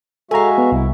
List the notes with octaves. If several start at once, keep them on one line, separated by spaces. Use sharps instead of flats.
G#3 F#4 A4 E5 F5 G#5 A#5
B3
C2 E4